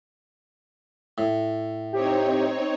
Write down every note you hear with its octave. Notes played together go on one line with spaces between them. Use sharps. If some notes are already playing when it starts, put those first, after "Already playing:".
A2
C4 D#4 G4 C#5